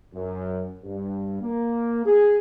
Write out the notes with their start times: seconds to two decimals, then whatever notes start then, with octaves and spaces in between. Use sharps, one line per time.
0.15 F#2
0.84 G2
1.42 A#3
2.06 G#4